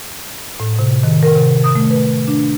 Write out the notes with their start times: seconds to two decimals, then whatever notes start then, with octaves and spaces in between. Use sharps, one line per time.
0.60 A2
0.79 C3
1.03 D#3
1.23 A#4
1.36 C3
1.64 D#6
1.75 A3
1.91 B4
2.28 D4